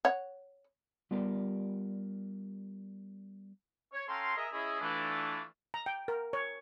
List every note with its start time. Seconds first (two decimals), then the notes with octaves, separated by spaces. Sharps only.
0.05 C#5 F#5
1.11 G3 B3 F4 G4 A#4 D5
3.93 C#5
4.09 C#4 A4 F5 G5 A#5 C6
4.36 G#4 A#4 D#5 E5
4.52 C#4 E4 G#4 D#5
4.81 E3 A3 D4 F4
5.74 A#5
5.86 G5
6.08 A#4
6.33 C#5